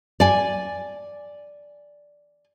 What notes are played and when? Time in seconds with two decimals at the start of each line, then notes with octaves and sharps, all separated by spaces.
0.20 D5 G#5